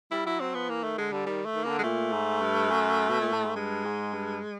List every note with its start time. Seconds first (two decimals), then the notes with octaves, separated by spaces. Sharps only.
0.11 G3 E4
0.26 F#3 E4
0.40 F#3 C4
0.54 F3 B3
0.69 E3 A#3
0.83 D#3 A3
0.98 D3 G#3
1.12 D3 G3
1.26 D#3 G3
1.46 A3
1.55 D#3
1.64 C#3 A#3
1.70 D3
1.79 G#3
1.83 A#2 A3
2.12 G#2
2.41 G2
2.70 F#2
3.09 B2
3.21 A#2
3.32 A2
3.44 G#2
3.56 G2 G#3
3.84 G#2
4.13 G2